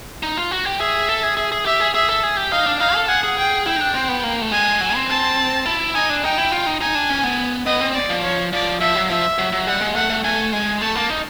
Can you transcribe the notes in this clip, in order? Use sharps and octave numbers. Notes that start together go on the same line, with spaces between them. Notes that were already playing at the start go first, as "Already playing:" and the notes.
D#4
F4
F#4
G4
G#4 E5
A4
G#4
G#4
G#4
G4 E5
G#4
G#4 E5
A4
G#4
G4
D#4 F5
D4
D#4 F5
A4
G#4 F#5
G#4
G5
E4 G5
D#4
D4
C4
B3
A#3
A3
G#3 G#5
F#3
C4
A5
E4
D#4 G#5
D4
D#4 G5
E4
F4
D#4
D#4 G#5
D4
C#4
B3
B3 D#5
C4
D5
F3
C#5
F3 D5
F3 E5
F#3
F3 E5
F#3
F#3
G3 F#5
G#3
A3 F#5
A3
A3 G#5
G#3 G#5
A3 A5
A#3
D#4